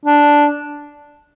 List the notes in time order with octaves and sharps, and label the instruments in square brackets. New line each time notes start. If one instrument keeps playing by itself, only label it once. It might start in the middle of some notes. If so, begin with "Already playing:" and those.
[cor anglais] D4